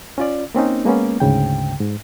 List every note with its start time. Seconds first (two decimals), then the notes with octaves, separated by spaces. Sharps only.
0.18 C#4 F4 D5
0.55 A#3 C4 C#4 D#4
0.85 G#3 A#3 B3 C#4
1.20 D2 G#2 C#3 G5
1.81 G#2